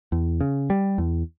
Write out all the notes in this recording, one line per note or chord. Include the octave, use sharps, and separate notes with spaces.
E2
C#3
G3
E2